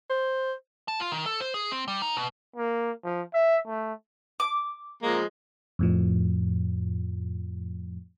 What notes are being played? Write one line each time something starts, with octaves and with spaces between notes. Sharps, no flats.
C5
A5
F4
D#3
A4
C5
G#4
C4
G3
D#4
B2
A#3
F3
E5
A3
D6
F3 G#3 A#3
F2 A2 F3